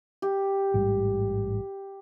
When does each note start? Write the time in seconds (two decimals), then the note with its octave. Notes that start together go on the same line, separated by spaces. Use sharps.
0.22 G4
0.74 A1 G#2 G3